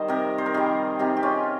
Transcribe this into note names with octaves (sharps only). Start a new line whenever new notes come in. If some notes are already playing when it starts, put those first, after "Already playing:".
Already playing: D#3 G3 C5 D#5
C3 G4 A#4
C5
A#4
D#3 G3 F4 G#4
C3 D#4 G4
G4
C#4 F4